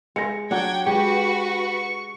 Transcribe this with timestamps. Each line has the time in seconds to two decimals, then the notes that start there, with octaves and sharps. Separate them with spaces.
0.16 G#3 A#6 C#7
0.51 F#3 D4 F#5 G5 G#6
0.86 G#3 F#4 G4 B4 C#6